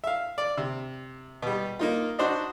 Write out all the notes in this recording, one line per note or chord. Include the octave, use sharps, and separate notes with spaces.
E5 F5
D5
C3
B2 G3
A#3 D#4 F4
D4 D#4 F#4 C5 D5 D#5